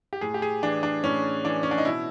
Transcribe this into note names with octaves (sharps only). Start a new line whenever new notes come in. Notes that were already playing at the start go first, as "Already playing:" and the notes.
G4
A2 G#4
G4
G#4
E3 D4
D4
A2 C#4
E3 D4
C#4
D4
D#4
B2 E4